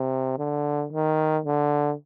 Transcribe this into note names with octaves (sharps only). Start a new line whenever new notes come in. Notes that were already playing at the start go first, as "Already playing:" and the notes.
Already playing: C3
D3
D#3
D3